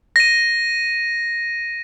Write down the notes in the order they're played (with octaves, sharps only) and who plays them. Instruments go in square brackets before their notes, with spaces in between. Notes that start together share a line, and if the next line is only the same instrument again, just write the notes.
[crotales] A#6 D#7